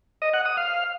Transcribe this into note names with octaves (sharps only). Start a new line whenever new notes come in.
D#5
F#5
D#6
F5